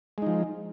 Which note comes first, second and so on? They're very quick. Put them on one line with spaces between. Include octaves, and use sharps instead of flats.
G#3 D#4 F3